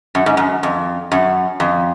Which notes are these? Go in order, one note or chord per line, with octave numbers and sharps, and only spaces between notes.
F#2
G#2
F#2
F2
F#2
F2